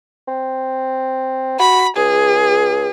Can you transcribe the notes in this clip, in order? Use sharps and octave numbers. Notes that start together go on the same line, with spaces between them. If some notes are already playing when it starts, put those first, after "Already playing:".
C4
F#4 B5
C#2 G#4